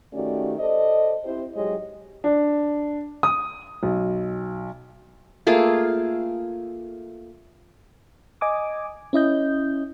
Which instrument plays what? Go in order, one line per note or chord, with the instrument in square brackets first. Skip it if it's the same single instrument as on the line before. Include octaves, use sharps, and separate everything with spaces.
[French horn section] D#3 A3 C#4 F#4 G4 D5
A4 C5 D5 D#5
C4 E4 G4 C5
G#2 F#3 G#3 G4 C#5 D#5
[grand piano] D4
D#6
B1
[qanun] A3 A#3 F4 G#4
[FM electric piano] D#5 G#5 D6 D#6
C#4 E4 D#5 G6